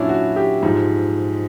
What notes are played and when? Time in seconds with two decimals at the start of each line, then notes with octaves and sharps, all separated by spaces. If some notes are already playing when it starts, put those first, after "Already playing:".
Already playing: A#2 F#3 C#4 D4 E4
0.09 F#4
0.36 G4
0.63 G#2 F3